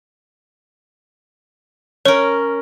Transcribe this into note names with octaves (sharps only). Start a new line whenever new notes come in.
C#4 A#4 C#5